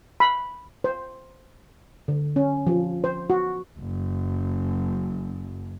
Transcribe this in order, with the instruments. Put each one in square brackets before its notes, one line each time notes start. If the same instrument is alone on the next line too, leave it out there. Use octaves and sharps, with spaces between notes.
[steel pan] B5
C5
D3
C#4
F3
C5
F#4
[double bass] F#1 F#2